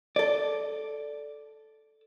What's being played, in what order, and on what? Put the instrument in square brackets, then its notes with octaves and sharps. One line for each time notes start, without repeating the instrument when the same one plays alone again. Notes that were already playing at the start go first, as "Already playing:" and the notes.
[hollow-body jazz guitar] A4 D5